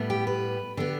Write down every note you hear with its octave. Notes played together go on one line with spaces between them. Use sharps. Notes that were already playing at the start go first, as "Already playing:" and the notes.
Already playing: A2 G3 B3
G4
B4
D3 B3 G4